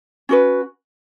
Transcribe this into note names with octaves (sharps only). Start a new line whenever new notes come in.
C#4 F#4 B4